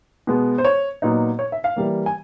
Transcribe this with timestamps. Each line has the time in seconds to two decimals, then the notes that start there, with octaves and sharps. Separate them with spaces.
0.27 B2 G#3 B3
0.58 C5
0.65 C#5
1.02 A#2 F#3 B3 D#4
1.39 C#5
1.52 E5
1.64 F5
1.76 E3 G3 A#3
2.06 G#5